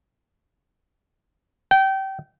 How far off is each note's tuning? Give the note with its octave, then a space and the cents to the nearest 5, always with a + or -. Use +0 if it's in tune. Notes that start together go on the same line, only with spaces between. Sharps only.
G5 -25